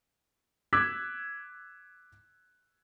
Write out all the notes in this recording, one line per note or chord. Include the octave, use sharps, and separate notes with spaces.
D6 E6 F#6 G#6 B6